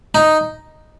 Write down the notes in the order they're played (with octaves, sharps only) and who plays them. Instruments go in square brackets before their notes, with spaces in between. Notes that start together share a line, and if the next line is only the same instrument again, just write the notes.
[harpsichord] D#4